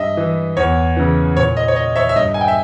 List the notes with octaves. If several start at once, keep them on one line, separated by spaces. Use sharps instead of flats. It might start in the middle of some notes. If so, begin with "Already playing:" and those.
Already playing: G2 D#5 E5
E3
E2 C#5
C#3 E3
A#2 C#5
D#5
C#5
D#5
C#5 E5
E5
G2 D#5
G#5
G5
E5